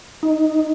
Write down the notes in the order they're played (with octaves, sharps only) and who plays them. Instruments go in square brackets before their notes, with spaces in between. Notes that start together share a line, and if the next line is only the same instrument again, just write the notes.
[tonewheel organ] D#4